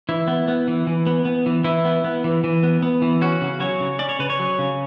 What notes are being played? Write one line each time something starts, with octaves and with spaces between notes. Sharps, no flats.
E3 E4
B3
B3
E3
E3
B3
B3
E3
E3 E4
B3
B3
E3
E3
B3
B3
E3
C#4 F#4
C#3
F#3 C#5
C#3
C#4 D5
C#5
C#3 B4
C#5
F#3
C#3